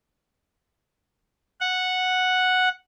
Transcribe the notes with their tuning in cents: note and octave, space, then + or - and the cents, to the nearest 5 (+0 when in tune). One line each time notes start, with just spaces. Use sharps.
F#5 -5